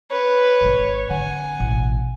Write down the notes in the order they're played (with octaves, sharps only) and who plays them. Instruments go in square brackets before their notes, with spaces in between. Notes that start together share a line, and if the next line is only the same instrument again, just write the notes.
[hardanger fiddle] B4 [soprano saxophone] C#5
[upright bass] G#1 G#2
[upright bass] D3 C4 [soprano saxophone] F#5 [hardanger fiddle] G#5
[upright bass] A1 B2